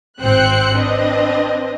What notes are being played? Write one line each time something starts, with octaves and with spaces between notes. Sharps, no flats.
G#1 C4 C5 G5 F#6 C#7
C4 D4 B4 D#5